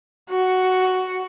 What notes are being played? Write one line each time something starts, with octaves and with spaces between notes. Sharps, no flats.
F#4